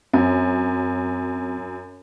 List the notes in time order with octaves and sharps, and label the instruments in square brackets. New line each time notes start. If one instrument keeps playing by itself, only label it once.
[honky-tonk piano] F#2 [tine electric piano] C4